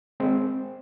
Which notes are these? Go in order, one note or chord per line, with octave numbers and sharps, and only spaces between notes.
G#3 C4